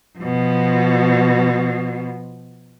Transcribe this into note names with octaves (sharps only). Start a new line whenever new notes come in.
B2 F3